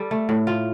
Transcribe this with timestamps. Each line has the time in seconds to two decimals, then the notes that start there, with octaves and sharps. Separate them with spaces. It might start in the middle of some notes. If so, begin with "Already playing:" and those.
Already playing: G3 A4
0.11 A3
0.29 A2
0.47 F4